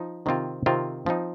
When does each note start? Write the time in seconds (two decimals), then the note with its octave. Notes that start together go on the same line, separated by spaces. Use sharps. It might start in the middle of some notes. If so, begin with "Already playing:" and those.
Already playing: F3 D#4
0.26 C3 D#3 C4 F4
0.66 C3 D#3 C4 F4
1.06 F3 C4 D#4